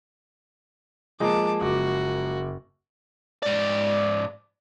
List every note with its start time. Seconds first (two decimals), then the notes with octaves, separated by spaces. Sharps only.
1.20 F3 G#3 A#3 G#4 D#5 A5 D6
1.61 F#1 F#4 D6
3.43 G#2 D5